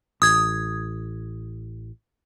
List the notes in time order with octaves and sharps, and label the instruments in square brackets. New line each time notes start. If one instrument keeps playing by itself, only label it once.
[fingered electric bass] A1 [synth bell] D#6 G#6